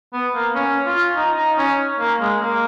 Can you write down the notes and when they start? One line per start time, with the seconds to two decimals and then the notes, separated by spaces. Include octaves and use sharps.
0.13 B3
0.35 A#3
0.55 C#4
0.86 F4
1.16 D#4
1.37 D#4
1.58 C#4
2.00 A#3
2.21 G#3
2.41 A#3